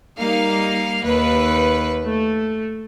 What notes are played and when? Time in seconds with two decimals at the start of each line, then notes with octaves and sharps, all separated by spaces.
0.19 G3 A#3 D#4 F5
1.05 D#2 B4
2.04 A3